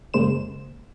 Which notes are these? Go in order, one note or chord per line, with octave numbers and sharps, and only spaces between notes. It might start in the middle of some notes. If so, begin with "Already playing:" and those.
F#2 C#3 G#3 A#3 C5 E7